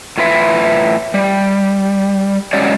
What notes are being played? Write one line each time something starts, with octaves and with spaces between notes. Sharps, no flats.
A2 F4 B4 E5
G3
F#3 G#3 C#4 F#4 G4 D5